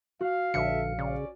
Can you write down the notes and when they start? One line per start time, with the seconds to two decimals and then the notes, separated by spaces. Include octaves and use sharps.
0.21 F#4 F5
0.54 A#1 D3 A4 E5 F5 C#7
0.99 C#3 C#4 D5